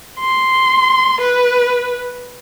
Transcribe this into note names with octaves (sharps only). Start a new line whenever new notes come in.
C6
B4